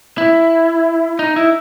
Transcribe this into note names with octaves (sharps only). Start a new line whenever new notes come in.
E4
D#4
E4